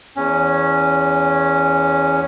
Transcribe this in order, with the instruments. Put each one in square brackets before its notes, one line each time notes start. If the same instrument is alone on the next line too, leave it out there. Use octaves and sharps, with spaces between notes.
[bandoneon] E2 C#4